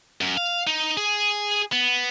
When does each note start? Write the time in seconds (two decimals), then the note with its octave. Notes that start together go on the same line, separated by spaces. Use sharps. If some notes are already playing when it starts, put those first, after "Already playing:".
0.21 F#2
0.37 F5
0.67 D#4
0.97 G#4
1.72 B3